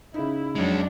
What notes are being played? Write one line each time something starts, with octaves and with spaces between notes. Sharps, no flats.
C#3 D#4 E4
F2 F#3 G#3 C#4 D4